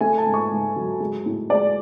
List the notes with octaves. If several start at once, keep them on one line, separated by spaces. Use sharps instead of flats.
A3 G#5
A5
G#2
C#6
G#2
F#3
G#3
A2
G#3 D5